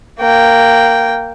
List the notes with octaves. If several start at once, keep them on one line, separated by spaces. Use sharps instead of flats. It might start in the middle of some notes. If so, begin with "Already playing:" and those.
A#3 G5